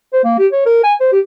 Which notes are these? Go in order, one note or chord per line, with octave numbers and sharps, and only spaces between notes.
C5
A#3
G4
C#5
A#4
G#5
C5
G4